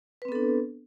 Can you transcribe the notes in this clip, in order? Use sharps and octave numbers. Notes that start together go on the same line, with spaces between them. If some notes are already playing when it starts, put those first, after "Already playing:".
B3 C4 D4 A4 B4